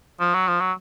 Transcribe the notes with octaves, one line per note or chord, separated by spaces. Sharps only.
F3
F#3
F3
F#3